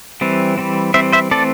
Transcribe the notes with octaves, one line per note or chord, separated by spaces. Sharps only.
E3 G3 C4
E3 G3 C4
E3 G3 C4 C5 E5
C5 E5
E3 A3 C4 A4 D5